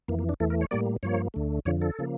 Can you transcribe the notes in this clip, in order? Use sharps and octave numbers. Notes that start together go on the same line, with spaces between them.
F2 E3 A#3
A#3
D4
E2 E3 A3 A4
A#4
C#5
A2 G3 A#3 D5
G2 F3 A#3 C#5
D2 D3 A3
F2 D3 F3 C#5
A4
C#3 F3 A#3